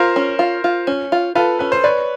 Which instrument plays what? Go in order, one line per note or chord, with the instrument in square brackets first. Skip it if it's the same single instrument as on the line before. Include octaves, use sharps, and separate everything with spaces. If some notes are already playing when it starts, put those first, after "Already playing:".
Already playing: [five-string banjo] F4 [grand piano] A#4 C5
[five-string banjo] C#4
F4
F4
C#4
F4
[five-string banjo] F4 [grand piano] A4 B4
[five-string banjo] C#4 [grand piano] B4
[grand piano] C5
[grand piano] B4 C#5 [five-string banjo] D5